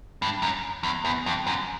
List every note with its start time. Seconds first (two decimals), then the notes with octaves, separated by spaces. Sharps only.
0.22 G2
0.42 F#2
0.83 E2
1.05 E2
1.26 F2
1.47 F#2